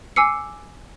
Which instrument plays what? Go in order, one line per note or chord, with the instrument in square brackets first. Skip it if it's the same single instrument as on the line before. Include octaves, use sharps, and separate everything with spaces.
[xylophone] G#5 D6 E6 C7 C#7